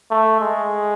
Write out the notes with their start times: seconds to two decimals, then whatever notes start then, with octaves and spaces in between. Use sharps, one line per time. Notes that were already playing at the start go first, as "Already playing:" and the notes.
0.11 A3
0.40 G#3